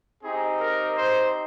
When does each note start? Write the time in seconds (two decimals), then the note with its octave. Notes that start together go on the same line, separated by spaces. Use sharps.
0.23 C4 D#4 G4 G#4
0.60 A#4
0.97 C5